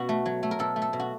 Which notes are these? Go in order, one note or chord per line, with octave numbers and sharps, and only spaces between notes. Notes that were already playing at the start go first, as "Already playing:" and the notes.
Already playing: B2 F#4
A3
F#3
A3
A#4
B2 A4
A3
A4
B2
F#4